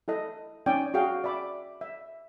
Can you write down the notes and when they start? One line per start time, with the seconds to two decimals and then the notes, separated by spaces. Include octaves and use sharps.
0.08 E4 A4 D#5
0.66 C#4 D#4 D5 G5 G#5
0.94 F#4 G#4 F5 G5
1.24 D5 E5 B5 D6
1.81 E5